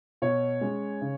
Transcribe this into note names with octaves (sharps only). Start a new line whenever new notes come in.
B2 C#5
G#3 C#4
C#3